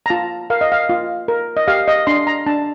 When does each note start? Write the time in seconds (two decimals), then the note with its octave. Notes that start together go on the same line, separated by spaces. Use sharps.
0.06 A#5
0.10 F4 A5
0.50 A#4 F5
0.61 D#5
0.72 F5
0.89 F4
1.28 A#4
1.57 D#5
1.68 G4 F5
1.88 D#5
2.07 D4 C6
2.27 A#5
2.46 D4 A5